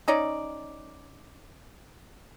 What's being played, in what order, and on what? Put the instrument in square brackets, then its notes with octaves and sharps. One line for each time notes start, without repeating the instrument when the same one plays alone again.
[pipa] C#4 D#4 D5